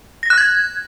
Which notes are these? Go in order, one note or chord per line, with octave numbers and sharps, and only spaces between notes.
A#6
F#6
G#6